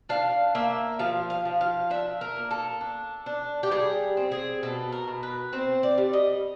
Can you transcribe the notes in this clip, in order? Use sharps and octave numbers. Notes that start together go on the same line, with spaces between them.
D4 F5
A#3 E5
F3 F5
F5
F3
F5
D4 E5
A#4
A#3
A4
D4
D4
G4
G3 G#4
C4
G#4
B2 A4
A#4
B2
B4
C4 C5
D5
G3
D#5